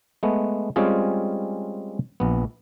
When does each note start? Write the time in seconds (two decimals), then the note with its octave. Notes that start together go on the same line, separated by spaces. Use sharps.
0.23 G#3 A3 B3
0.76 G3 G#3 C4 C#4 F4 G#4
2.20 A#1 B3